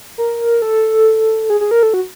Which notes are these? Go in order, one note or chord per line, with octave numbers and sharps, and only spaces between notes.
A#4
A4
G#4
G#4
A#4
A4
F#4